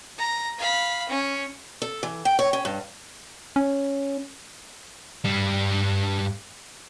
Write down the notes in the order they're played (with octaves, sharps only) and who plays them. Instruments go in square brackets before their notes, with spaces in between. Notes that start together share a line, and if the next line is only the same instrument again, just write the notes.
[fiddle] A#5
F5 B5
C#4
[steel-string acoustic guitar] A4
E3
G5
C#5
C#4
G2
[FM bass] C#4
[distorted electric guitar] G2 G3